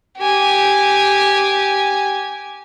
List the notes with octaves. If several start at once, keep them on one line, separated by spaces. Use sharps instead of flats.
G4 G#5